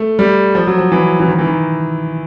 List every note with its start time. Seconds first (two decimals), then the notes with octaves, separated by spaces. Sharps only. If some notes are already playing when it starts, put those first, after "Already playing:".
Already playing: A3
0.19 G3
0.55 F3
0.67 F#3
0.78 F3
0.92 E3
1.20 E3
1.28 D#3
1.39 E3
1.47 D#3